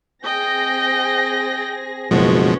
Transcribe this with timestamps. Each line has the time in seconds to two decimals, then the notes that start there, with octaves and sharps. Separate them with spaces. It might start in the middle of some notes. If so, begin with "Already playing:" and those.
0.24 C4 G#4 D#5 G5 A#6
2.11 F#1 B2 F3 G#3 C#4 F#4 B4